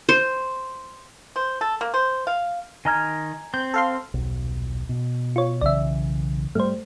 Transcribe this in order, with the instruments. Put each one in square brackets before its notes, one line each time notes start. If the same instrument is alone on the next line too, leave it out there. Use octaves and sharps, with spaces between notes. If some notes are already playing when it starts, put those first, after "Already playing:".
[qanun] C5
[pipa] C5
A4
A#3
C5
F5
[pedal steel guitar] D#3 D#5 F6 [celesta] G#5 A#5 G#6
[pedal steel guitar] C4 [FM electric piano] G6
[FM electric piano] A4 F5 C6
[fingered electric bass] D#1 B1
B2
[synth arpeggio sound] F4 C#5
[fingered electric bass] B1 C#3 E3 [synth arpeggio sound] D5 E5
[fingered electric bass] G#2 G3 [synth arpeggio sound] A3 C5